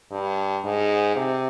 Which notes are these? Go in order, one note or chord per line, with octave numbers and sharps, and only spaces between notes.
G2
G#2
C3